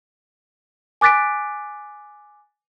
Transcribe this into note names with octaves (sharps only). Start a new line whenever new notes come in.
G#5 D6 F#6 A6 B6 D7